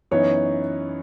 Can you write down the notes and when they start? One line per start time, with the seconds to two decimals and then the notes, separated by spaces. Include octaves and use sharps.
0.11 F#2 E3 B3 D#4 C#5